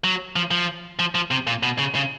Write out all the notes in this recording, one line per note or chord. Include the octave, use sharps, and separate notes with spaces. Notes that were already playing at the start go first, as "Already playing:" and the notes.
F#3
F3
F3
F3
F3
C3
A#2
B2
C#3
C#3